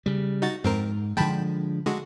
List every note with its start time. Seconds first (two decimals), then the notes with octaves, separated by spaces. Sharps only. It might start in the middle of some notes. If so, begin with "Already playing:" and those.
0.06 C#3 G3
0.42 D#4 F#4 A6
0.64 F2 G#2 C4 A#4
1.17 D3 F3 G#3 G5 A5 B5
1.86 D3 G#3 F#4